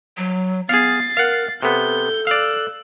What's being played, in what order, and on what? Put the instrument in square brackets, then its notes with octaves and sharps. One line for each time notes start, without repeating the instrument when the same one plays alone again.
[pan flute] F#3
[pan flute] B3 [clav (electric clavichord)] G#4 F5 [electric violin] A6 C7
[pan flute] A#4 [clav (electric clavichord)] F5 F#5
[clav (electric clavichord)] C3 B3 [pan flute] A4 [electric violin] G6
[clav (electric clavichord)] D5 F5 [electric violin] E6 F#6